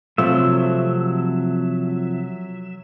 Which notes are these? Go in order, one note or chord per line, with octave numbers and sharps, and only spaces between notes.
C3 F3 F#3 A3 E5